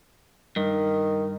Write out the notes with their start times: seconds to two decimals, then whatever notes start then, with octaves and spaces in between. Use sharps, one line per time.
0.56 G2 D#3